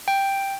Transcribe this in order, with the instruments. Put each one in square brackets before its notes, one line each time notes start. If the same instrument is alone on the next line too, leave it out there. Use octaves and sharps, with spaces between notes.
[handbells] G5